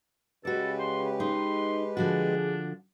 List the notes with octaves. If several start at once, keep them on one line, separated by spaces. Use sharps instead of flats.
C#3 G#3 F#4 G4 A4 B4 D5
C6
D#4 C6
D3 F3 D4 F#4 G#4